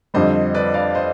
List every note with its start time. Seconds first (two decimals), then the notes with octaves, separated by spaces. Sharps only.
0.14 F2 D3 G3 C5 D#5
0.54 B4 D5
0.74 D5 F5
0.95 C5 D#5